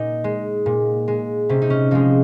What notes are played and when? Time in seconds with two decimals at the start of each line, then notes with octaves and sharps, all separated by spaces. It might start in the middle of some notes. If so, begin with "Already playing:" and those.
Already playing: A#2 D#4
0.24 G#3
0.66 A#2
1.08 G#3
1.49 C3 C#4
1.62 D#4
1.70 C#4
1.91 F3 G#3 D#4